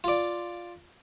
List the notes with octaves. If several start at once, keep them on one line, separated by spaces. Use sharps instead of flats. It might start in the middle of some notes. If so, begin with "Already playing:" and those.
F4 D5